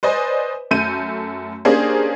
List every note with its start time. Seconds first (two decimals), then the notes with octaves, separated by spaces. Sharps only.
0.03 B4 C5 D5 D#5 G#5
0.71 F#2 A3 G6 D#7
1.65 A#3 C#4 D4 G4 G#4 C5